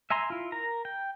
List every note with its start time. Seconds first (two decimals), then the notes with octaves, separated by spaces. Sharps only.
0.10 E5 G#5 A#5 C6
0.30 E4 F4
0.52 A#4 A#5
0.85 G5